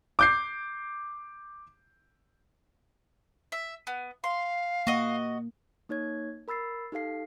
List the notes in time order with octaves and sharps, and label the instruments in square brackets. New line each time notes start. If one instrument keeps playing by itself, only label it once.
[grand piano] D6 G6 C7
[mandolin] E5
B3
[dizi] F5 [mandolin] C6
[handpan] A#3 [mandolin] F#4 D#5
[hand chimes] A#3 D#4 C#5 G#6
A#4 B5 E6 A6 C7
D#4 G4 A4 F5 C7